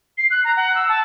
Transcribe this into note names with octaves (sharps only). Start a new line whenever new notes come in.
C7
F#6
A#5
F#5
E6
A5